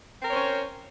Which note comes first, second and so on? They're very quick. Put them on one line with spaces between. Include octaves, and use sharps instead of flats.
C4 A#4 C#5 C5 C#4